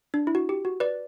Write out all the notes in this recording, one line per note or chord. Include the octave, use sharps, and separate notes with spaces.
D4
E4
F#4
G4
F#4
B4 D5